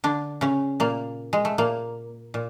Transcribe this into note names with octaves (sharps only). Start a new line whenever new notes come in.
D3 D4
C#3 C#4
A#2 A#3
G#3
A3
A#2 A#3
A#2